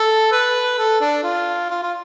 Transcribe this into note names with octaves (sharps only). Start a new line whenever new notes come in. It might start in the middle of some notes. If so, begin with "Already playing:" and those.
Already playing: A4
B4
A4
D4
F4
F4
F4